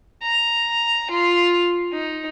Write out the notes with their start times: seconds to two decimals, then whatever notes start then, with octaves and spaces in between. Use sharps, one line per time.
0.23 A#5
1.10 F4
1.93 D#4